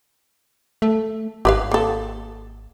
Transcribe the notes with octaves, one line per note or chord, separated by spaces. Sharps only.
A3
G#1 G4 B4 F5
A#3 A4